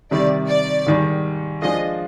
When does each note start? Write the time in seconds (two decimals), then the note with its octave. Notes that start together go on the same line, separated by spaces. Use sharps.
0.11 C3 D#3 G3 D5
0.49 D5
0.86 G#2 D#3 G3
1.62 F3 G#3 D4 F4 G#4 D#5